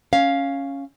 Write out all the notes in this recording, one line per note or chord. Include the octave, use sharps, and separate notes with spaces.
C#4 F5